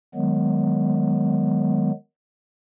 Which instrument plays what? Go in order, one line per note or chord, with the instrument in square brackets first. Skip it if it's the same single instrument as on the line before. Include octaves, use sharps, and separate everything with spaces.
[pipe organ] D#3 F#3 G#3 B3